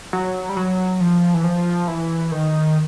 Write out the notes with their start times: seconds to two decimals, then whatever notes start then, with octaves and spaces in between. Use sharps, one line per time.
0.13 F#3
0.49 G3
0.57 F#3
1.01 F3
1.34 E3
1.44 F3
1.88 E3
2.32 D#3